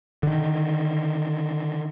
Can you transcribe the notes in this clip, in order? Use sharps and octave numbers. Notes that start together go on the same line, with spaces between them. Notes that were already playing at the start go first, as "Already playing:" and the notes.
D3 D#3